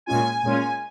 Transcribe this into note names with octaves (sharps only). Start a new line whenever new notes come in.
A#2 G#3 C#4 F4 G#5
A#2 G#3 C#4 F4